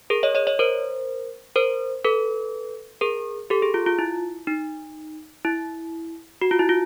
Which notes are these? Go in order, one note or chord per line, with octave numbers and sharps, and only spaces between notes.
G#4 A#4
C#5 D#5
C#5 D#5
C#5 D#5
A#4 C5
A#4 C5
A4 B4
G#4 A#4
G4 A4
G#4
F4
F4
E4
D#4
E4
F#4
F4
E4
F4